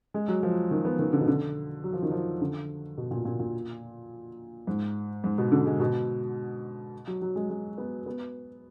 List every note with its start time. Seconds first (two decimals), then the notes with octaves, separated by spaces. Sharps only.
0.14 G#3
0.28 F#3
0.43 F3
0.71 D#3
0.85 B3
0.99 D#3
1.13 D3
1.21 B2
1.28 D3
1.84 F#3
1.93 F3
2.02 D#3
2.11 F3
2.41 D3
2.97 B2
3.11 A#2
3.25 A#2
3.40 A#2
4.67 G#2
5.24 G#2
5.38 B2
5.52 D3
5.66 G#3
5.80 B2
7.07 F#3
7.22 F#3
7.36 G#3
7.50 G#3
7.78 B3
8.06 B3